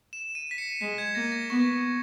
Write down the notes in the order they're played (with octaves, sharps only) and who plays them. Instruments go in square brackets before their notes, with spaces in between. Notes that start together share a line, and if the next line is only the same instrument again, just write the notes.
[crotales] E7
D#7
B6
C#7
[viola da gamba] G#3 [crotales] B6
[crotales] G#6
[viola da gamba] A#3 [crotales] A#6
[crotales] A#6
[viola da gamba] B3 [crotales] C#6